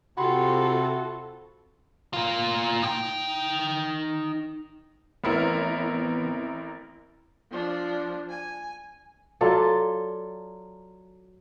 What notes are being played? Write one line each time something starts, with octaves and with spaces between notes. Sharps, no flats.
C3 F4 F#4 A4 B5 C6
A#2 F4
D#4 G5
A1 E3 B3 C4 E4 A#4
F3 D4
G#5
F#3 F4 A4 D5